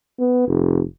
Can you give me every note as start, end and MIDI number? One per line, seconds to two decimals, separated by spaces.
0.19 0.45 59
0.47 0.82 29